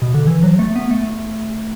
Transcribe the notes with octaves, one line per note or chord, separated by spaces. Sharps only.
B2
D3
E3
F#3
A3
B3
A3